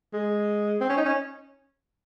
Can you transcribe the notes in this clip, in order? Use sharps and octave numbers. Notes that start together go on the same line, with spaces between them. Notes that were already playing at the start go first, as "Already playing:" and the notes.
G#3
C4
C#4
D#4
C#4